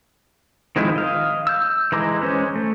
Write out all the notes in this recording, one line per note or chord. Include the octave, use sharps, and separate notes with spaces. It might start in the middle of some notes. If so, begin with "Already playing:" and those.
D#3 F3 G#3 C4 E4
D#5 F5
E6 G6
E3 G#3 A#5 D6
G#3 C#4 C5
A3